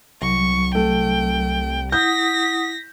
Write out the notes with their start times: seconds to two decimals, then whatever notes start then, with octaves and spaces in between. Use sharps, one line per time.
0.22 C2 F#3 C#6
0.75 A3 G5
1.92 E4 F#5 D#6 G6 A#6 B6